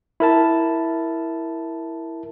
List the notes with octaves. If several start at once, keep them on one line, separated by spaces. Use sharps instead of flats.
E4 A#4 A5